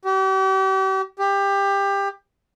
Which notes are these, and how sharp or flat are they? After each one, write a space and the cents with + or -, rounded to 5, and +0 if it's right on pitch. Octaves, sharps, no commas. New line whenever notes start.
G4 -40
G4 +20